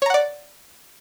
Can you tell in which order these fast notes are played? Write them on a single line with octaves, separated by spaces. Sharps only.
C#5 A#5 F#5 D5